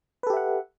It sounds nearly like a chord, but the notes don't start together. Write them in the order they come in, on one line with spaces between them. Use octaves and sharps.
B4 A4 G4 E5 F#5